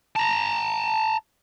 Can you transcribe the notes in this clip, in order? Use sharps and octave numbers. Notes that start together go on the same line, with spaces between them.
A5 A#5